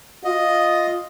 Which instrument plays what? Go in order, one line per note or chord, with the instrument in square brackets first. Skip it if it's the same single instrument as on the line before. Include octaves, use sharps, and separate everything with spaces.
[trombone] F4 [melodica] D#5